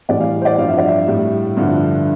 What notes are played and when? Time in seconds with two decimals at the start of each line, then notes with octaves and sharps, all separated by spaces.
0.09 A2 E3 G3 D5
0.21 F5
0.41 C5
0.45 D5
0.58 G2 F3 F5
0.68 E5
0.78 D5
0.87 E5
1.08 A2 G3
1.57 G2 D3 F3